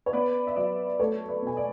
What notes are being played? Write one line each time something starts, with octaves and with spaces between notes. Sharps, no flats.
C#5
B3 B4 D5
E5
F#3 B4 D5
A3 A4 C#5
B4 D5
B2 G#5
D5